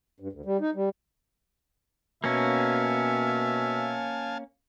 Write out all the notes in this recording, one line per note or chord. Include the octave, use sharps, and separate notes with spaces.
G2
D2
G3
D#4
G3
B2 A#3 C#4 E5 F5 G#5 A5